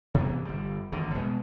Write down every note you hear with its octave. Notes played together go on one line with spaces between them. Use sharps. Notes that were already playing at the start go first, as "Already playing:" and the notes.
C3 E3 B3
G1 G3
G#1 E2 D3 D#3
B2 G#3 B3